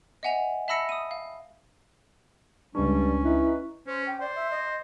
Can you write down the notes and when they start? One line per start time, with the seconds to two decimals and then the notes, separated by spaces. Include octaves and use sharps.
0.23 D#5 E5 F#5 G#5 F7
0.68 E5 A5 B5 E6 A#6 C#7
0.89 D#6 D#7
1.11 F5
2.75 C#2 G2 G3 C#4 D4
3.24 D#4 E4 B4
3.87 C#4 C5
4.07 G5
4.21 C5 D5
4.35 E5
4.51 D#5